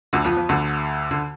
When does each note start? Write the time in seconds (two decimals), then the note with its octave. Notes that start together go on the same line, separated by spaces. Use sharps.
0.13 D2 D3
0.25 F2 F3
0.37 F2 F3
0.49 D2 D3
1.11 D3